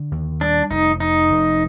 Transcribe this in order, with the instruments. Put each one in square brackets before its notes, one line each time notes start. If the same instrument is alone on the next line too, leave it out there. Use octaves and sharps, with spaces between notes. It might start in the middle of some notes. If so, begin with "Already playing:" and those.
Already playing: [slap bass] D3
D#2
[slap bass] G3 [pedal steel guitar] D4
[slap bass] F1 [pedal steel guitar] D#4
[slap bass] F2 [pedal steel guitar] D#4
[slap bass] F1